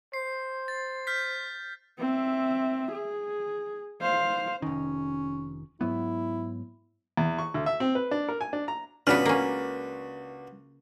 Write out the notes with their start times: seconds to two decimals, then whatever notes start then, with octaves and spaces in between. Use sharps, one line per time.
0.13 C5 C7
0.68 A6
1.07 F6 G6 B6
1.99 C4 E5
2.92 G#4
4.02 C5 F5
4.62 F1 D#3 C#4
5.81 G#2 F#3 B3 E4
7.17 E2
7.39 C#6
7.54 D2
7.66 E5
7.80 C4
7.95 B4
8.11 D4
8.28 A#4
8.41 G#5
8.53 D4
8.68 A#5
9.07 C#2 C#3 B3 D4 F#4 B4 F6
9.25 A#3 C#4